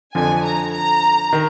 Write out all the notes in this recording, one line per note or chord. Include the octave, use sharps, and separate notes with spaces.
F2 D3 F3 G#5
A#5
A#5
D#3